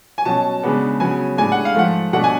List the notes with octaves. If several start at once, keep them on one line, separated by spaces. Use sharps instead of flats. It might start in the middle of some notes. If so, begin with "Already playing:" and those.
G#5
B2 F#3 C#4 A5
C#3 G#3 B3 D4
C#3 F#3 B3 G#5
A2 G#3 D4 G#5
F#5
F5
G#2 F3 A3 F#5
B2 A3 D4 F#5
G#5